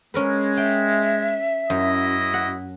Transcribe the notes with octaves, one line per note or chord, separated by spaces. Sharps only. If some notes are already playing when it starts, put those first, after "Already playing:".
G#3 C#4 A#4 B4
E5 G5
F#2 E4 F#4 D#5
F#5